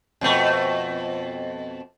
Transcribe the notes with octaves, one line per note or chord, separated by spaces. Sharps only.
F2 B2 A3